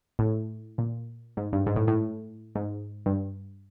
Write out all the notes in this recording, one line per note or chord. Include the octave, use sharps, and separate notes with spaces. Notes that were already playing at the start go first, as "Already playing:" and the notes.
A2
A#2
G#2
G2
G#2
A2
A2
G#2
G2